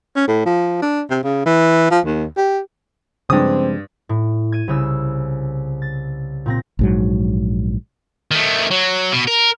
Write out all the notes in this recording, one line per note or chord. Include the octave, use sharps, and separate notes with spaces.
C#4
A2
F3
D4
C3
C#3
E3
F3
D#2
G4
G2 C#3 F3 G#3 C4 D#6
A2
G#6 D#7
C2 C#3 E6
A6
A#2 C4 A#6
A#1 G#2 F#3
D#3 A3
F#3
B2
A#4